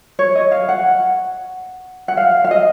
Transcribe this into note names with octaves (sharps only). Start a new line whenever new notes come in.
C#5
D#5
F5
F#5
F#5
F5
F5
D#5